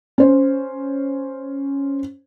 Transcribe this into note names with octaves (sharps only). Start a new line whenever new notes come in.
C#4 C5